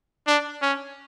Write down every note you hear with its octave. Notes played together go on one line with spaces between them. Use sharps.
D4
C#4